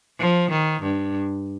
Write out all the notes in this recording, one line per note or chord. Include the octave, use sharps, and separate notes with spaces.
F3
D#3
G2